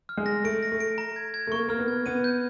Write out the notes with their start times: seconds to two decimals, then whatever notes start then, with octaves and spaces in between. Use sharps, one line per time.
0.09 F6
0.18 G#3
0.26 A#6
0.44 A3 D7
0.63 A#6
0.72 A3
0.80 D7
0.98 A#5
1.16 G#6
1.34 G#6
1.47 A3
1.52 A#3 C#6
1.69 A#3 F6
1.79 B3
1.88 G#6
2.06 B3 D#7
2.24 G6